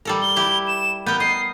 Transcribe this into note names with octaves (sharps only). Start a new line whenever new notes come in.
G3 A4 A#4
G7
E4 G4
E7
B3 A#4 G6
D#5 C7